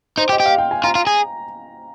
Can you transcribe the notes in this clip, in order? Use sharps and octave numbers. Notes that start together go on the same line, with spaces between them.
D#4 C5
G4
D#5
G4
F5
G5
G#5
F4 A#5
F4
G#4